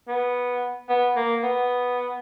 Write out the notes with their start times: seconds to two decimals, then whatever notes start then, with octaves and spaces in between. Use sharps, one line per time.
0.08 B3
0.89 B3
1.16 A#3
1.43 B3